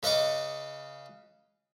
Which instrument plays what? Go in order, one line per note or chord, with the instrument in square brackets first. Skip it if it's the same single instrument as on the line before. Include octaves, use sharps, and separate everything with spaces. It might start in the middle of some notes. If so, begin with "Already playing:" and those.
[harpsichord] C#3 B4 D#5 C#6 D6